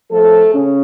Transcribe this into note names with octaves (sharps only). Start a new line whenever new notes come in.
A2 F3 A3 A4
C#3 C#4